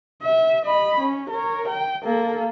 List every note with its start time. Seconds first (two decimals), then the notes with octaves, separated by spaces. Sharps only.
0.22 E5
0.65 D#5 B5
1.00 C#4
1.30 A#4 C#5
1.69 G5
2.04 A#3 A4